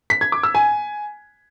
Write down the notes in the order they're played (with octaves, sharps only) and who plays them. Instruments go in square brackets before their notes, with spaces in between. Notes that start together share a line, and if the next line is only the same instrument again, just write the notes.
[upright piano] B6
G#6
D6
E6
G#5